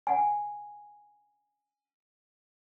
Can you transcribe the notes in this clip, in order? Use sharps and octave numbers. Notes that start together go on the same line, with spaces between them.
F#5 G#5